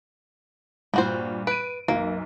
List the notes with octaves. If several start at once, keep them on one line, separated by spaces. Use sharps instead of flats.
G2 A#2 G3 F#4 C5
B4 D7 D#7
B1 F#2 A#3